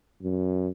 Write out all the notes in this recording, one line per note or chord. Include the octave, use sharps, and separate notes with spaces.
F#2